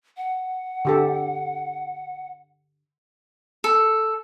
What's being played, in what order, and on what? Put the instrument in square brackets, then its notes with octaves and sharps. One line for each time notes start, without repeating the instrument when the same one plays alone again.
[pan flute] F#5
[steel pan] D3 G4 A4
[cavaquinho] A4